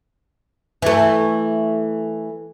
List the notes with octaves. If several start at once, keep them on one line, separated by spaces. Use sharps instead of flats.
E3 A3